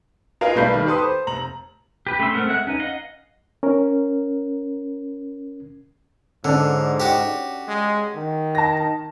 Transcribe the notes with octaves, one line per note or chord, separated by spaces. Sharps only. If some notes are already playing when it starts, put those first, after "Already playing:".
F4 G#4 A#4 B4 D#5 F5
B1 G3 A3 B4 G6 C7
D#3
G4 A4 B4 C6 D#6
C5
F1 A#5 F#7
G4 B4
A3 C#4 B5 C6 E6
A3 A#3 C4 A#4 F#5
G#3 E5 F#5 F#6
C#4 D#4 B4
D#5 F5 F#5
C#4 A#4
G#2 D3 C#4 D4 A4
F#4 G4
G#3
D#3
A5 A#6